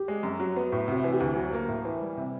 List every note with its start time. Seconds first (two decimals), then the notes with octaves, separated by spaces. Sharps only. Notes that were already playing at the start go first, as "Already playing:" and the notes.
Already playing: G4
0.08 G#3
0.23 F#2
0.40 F#3
0.56 B3
0.72 A2
0.88 C3 F#4
1.04 E3
1.13 G4
1.20 D2
1.36 F#3
1.53 A#3
1.68 A2
1.85 E3
2.01 G3
2.17 C3